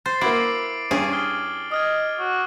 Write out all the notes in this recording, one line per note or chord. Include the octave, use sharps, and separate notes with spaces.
C5 A6 C7
A#3 E4 F#4 D6 D7 F#7
G2 C#4 G#4 A6
D#6 F6 G7
D#5 D#6 F6 G#6
F#4